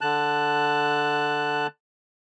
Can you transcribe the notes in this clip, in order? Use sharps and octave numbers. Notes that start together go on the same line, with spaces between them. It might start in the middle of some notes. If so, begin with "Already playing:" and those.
D3 A5 F#6